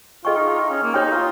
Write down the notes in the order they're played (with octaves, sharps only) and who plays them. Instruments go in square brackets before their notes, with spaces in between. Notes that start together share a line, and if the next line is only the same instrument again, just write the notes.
[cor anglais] F4 [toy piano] G#4 D#5 G5 C#6
[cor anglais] D#4
F4
D#4
C#4
A#3
[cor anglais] D#4 [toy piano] G4 C#5 G5 C6
[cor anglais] F4